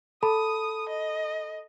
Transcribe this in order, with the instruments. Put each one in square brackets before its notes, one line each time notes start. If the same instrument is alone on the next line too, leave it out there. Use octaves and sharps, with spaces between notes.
[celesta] A4 A5 B5 [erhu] D#6
[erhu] D#5